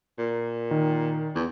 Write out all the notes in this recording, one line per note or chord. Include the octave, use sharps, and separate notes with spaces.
A#2
D#3
E2